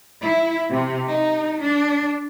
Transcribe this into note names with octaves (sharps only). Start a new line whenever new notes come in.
E4
C3
D#4
D4